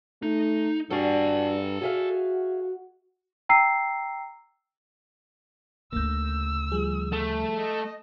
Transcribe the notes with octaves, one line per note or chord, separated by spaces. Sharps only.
A3 D#4
G2 G3 D4 F#4 A4 G#5
F#4 G#4 E5 F5
G5 A#5 E6 C7
D2 C#3 A#3 E6 G6
F3 G3 G#4
A3
D#5